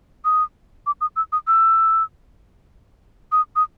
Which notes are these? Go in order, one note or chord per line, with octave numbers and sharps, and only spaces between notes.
D#6
D6
D#6
E6
D#6
E6
D#6
D#6